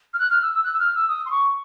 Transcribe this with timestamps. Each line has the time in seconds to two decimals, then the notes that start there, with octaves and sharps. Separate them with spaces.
0.14 F6
0.19 F#6
0.30 F6
0.42 E6
0.53 E6
0.64 F#6
0.74 E6
0.79 F6
0.95 E6
1.08 D#6
1.26 C6
1.31 C#6